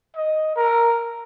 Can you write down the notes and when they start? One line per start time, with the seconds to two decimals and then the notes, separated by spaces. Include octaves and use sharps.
0.16 D#5
0.56 A#4